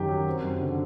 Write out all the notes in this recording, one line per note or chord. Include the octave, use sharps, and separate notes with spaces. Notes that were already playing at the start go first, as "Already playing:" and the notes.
Already playing: F#2 D#3 G4
F#3
C4
F#2
D3